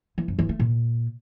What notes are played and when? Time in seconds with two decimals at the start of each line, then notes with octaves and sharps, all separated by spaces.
0.18 E3
0.28 F#2
0.39 E3
0.49 A3
0.60 A#2